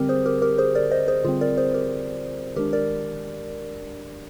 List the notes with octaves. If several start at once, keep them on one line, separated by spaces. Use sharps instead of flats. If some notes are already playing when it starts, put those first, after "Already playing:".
Already playing: D3 G3 C4 G4 A#4
G#4 C5
G4 A#4
G4 A#4
G#4 C5
A#4 D5
C5 D#5
G#4 C5
D3 G3 C4 F4 G#4
A#4 D5
G#4 C5
G4 A#4
D#3 G#3 D4 G4 A#4
A#4 D5